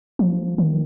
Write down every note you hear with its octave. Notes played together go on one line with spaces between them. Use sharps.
F3
D#3